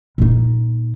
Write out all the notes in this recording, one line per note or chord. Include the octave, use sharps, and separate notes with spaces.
A#2 D#4